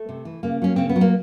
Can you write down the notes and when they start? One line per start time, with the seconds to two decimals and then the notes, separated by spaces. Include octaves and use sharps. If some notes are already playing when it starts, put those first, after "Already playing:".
Already playing: A3
0.09 C3
0.25 E3
0.43 C#3 A#3
0.62 F#3 C#4
0.76 C#3 C4
0.89 B3
0.96 F#3
1.01 A#3